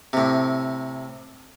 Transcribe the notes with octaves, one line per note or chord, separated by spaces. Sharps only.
A2 C3